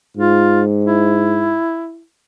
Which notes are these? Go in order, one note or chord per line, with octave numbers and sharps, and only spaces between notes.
G#2 F4
E4